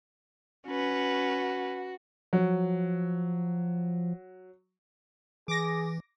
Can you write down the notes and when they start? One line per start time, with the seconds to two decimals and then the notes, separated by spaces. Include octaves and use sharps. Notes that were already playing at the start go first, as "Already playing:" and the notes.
0.67 C#4 F#4 B4
2.33 F3 F#3
5.48 E3 G#4 D6 A#6